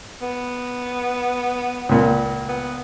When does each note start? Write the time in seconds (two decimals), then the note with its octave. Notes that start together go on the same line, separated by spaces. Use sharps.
0.22 B3
1.89 C#2 A#2
2.49 B3